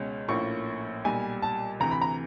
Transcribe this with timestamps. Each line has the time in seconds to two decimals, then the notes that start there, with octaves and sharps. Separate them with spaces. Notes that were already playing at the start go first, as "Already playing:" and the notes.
Already playing: C#2 B2 G#3 C#4
0.28 A#1 A2 F3 A#3 C#4 C#6
1.04 B1 A#2 G3 G#5
1.42 A5
1.80 D2 C3 E3 A#5
1.91 B5
2.02 A#5